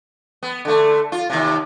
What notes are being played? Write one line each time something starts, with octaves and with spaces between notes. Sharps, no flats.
B3
D3 A3
F4
D#2 C3